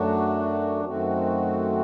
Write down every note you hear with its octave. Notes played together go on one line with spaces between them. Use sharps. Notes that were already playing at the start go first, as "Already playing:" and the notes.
Already playing: F#2 F#3 A3 D4 F#4
F#2 D#3 A3 C4 F#4